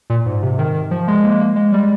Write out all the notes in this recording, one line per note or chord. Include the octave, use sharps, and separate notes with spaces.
A#2
G#2
C3
D#3
D#3
F3
G#3
A#3
A#3
G#3
G3